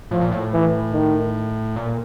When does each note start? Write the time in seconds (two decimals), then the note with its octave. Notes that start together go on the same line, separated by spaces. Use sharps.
0.11 A2 F3
0.21 A#2
0.31 A2
0.53 E3
0.93 D#3
1.76 A#2